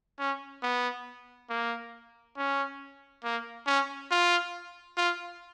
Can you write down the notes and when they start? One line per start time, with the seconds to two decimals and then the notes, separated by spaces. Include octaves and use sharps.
0.19 C#4
0.63 B3
1.50 A#3
2.37 C#4
3.24 A#3
3.67 C#4
4.11 F4
4.97 F4